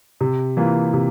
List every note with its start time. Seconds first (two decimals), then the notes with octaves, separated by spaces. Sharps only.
0.21 C3
0.57 E3 A#3 F4
0.93 C3